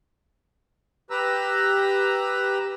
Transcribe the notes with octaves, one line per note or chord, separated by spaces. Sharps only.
G4 B4 A#5 E6